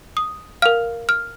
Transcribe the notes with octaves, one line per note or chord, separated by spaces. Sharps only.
D#6
A#4 F5 F6
F6